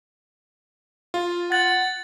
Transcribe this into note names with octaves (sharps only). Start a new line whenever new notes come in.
F4
F#5 A6